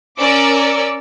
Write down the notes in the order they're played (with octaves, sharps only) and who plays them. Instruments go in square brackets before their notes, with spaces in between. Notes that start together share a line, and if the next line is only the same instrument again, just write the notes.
[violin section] C#4 A#4 D5 D6 E6 C#7